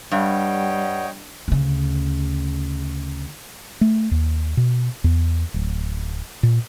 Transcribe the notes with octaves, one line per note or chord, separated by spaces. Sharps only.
G2 G3 C#5 D#5 F#5 G5
D2 C#3
A3
D#2
B2
E2
D1
A#2